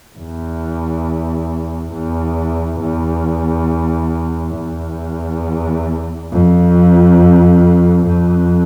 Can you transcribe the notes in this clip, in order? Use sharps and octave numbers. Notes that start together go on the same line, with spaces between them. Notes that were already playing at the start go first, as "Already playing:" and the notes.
E2
E2
E2
E2
F2
F2